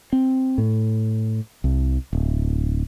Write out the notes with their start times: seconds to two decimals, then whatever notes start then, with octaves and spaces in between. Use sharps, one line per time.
0.13 C4
0.58 A2
1.64 C2
2.13 D1